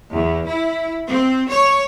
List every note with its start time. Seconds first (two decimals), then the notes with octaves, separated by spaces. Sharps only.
0.13 E2
0.46 E4
1.09 C4
1.50 C#5